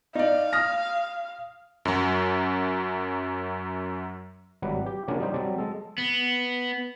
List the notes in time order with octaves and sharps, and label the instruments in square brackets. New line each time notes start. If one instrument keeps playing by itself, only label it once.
[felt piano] D#4 D5 [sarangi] F5
[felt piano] D#6 F6 A#6
[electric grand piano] F#2 F#3
[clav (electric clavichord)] G#1 F#3 G3 B4
G4
C#3 F#3 A#3 D4 F4 G#5
G3 D#4 G4 C5
F#3 G3 C4 A5
G#3 A4
[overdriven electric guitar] B3